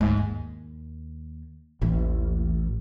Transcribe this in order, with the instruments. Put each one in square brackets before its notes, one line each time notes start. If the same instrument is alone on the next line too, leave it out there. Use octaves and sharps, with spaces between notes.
[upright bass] D2 G#2
D#2
[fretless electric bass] A1 [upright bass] D#2 E3